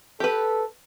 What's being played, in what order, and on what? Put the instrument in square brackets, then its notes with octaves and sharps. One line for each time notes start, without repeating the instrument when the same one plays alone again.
[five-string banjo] G4 B4 [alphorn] A4